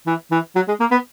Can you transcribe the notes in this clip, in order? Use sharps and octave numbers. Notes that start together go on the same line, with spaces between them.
E3
E3
F#3
G#3
A#3
B3